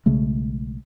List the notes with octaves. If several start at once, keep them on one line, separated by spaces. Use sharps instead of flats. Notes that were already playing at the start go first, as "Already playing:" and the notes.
B1 C#3 G#3 A3